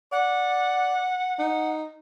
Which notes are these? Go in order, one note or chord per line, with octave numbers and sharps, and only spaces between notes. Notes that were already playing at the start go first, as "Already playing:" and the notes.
D5 F#5
D#4